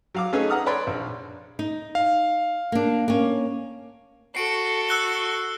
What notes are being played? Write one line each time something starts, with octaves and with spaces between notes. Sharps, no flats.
F#3 F5 D6
A3 C#4 D#4 G#4 B4
F#5 A#5 D#6 F6
B4 C#5 D5 B5 C6
A#1
D#4
F5
A#3 D4
A#3 C#4
F#4 A4 C7 D7
E6 F#6 G7